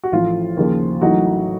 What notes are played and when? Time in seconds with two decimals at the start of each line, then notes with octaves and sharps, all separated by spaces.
0.03 F#4
0.12 A1 A2 F3 F4
0.57 D#2 C#3 F3
1.01 A1 A2 F#3 D#4 F#4